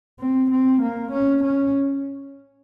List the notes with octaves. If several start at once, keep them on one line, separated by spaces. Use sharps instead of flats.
C4
C4
A#3
C#4
C#4